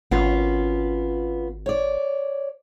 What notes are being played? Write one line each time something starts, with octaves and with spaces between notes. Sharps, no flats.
G#1 B3 C#4 F4
C#5 D5